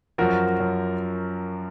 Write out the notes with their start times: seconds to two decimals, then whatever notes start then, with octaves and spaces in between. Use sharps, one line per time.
0.18 F#2 F3 F#4 A#4
0.60 F#2 F3